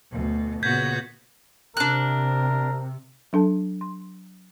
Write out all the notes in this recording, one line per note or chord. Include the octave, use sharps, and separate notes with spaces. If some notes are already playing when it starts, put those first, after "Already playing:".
D2 B2 A3
A#2 C#3 B3 F#4 G6 G#6 B6
C3 D4 A#4 F#6
F#3 D4 A4 A5
C6